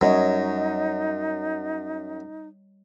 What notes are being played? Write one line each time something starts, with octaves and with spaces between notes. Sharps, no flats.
F#2 G3 D#4 C#5 D#5